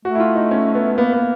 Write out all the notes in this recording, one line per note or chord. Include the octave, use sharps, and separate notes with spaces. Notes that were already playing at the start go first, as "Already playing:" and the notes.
A3 F#4
E4
F4
D#4
C#4
B3
A#3 B3
B3